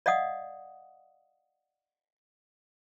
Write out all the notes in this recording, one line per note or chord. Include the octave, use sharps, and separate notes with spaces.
D5 D#5 F5 F#5 D#6